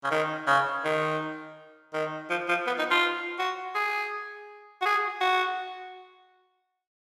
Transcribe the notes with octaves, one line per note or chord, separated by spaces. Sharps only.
C#3
D#3
C#3
D#3
D#3
F3
F3
B3
D#4
F4
F#4
G#4
F#4
G#4
F#4